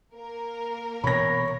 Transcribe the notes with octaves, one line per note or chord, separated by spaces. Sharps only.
A#3 A#4
B2 E3 B3 C#5 B5 A#6